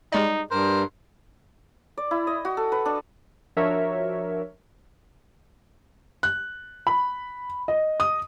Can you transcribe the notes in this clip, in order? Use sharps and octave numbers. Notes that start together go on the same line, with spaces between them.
G3 G#3 D#4 D5
G2 A#4 C5
D5
E4
D#5
F#4
A4
B4
D4
F3 D4 F#4 A#4 C#5 E5
F#6
B5
D#5
D#6